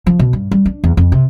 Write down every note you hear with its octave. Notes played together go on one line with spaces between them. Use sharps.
F3
B2
G2
G3
D4
E2
F2
C3